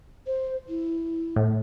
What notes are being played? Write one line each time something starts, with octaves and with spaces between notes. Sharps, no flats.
C5
E4
A2